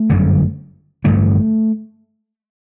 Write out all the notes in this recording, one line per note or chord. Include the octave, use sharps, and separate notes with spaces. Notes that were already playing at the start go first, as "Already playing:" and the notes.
Already playing: A3
G1 F#2 D3
A1 G2 D3 A3